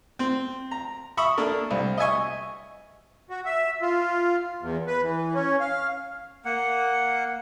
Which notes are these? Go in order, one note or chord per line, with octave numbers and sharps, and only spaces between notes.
C4
A#5
E5 B5 C#6 D#6
A#3 D4 A4 A#4
C2
D#5 E5 G#5 C#6
F#4
E5
F4
E2
B4
E3
C#4
F5
A#3 F#5